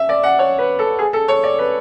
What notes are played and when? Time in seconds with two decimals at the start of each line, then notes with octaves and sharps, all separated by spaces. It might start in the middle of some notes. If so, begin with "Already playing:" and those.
Already playing: E5
0.09 D5
0.23 F#5
0.39 C#5
0.58 B4
0.79 A4
0.99 G#4
1.13 A4
1.28 C#5
1.43 D5
1.59 B4